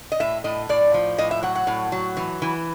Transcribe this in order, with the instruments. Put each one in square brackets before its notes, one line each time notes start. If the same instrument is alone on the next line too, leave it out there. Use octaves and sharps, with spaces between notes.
[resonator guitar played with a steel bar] D#5
A2 E5
A2 D#5
A2 D5
F3
A2 D#5
E5
F#3 F#5
F#5
A2
F#3
E3
E3